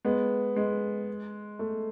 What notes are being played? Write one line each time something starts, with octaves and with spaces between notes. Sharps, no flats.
G#3 B3
G#3
A3